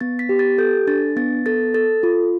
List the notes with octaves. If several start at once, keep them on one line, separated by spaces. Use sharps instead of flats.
B3 A6
B6
G4
A6
A4 G6
D4 A6
B3 A6
A4 A6
A4 A6
F4